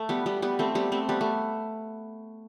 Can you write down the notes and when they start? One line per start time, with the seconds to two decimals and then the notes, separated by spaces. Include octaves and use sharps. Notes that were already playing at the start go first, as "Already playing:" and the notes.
Already playing: A3
0.09 G3 B3
0.26 G3 B3
0.42 G3 B3
0.59 A3 C4
0.75 G3 B3
0.92 A3 C4
1.09 G3 B3
1.21 A3